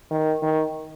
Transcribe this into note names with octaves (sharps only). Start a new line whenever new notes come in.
D#3
D#3